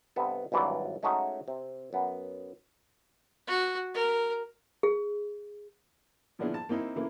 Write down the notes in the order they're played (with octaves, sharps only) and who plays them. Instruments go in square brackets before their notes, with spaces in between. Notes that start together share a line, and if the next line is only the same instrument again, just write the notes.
[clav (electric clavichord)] G2 C3 B3 A4
G#1 G2 E3 F#3 D5
G#3 A3 C#4 D#4 F#4
C3
F#2 B3
[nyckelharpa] F#4
A#4
[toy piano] G#4
[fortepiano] A#2 F3 B3 D4 E4 G#4
A5
A#3 C4 D#4 E4
C#3 E3 A3 A#3 E4